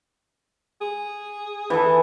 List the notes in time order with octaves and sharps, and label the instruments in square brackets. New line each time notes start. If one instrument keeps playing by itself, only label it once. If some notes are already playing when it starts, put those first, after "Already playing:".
[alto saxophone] G#4
[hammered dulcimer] E3 A4